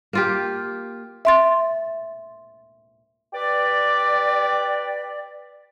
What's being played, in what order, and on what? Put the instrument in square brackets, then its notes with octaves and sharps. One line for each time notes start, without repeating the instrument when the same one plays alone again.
[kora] A#3 F4 G4
[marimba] E5 C6 A6
[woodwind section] G4 B4 D5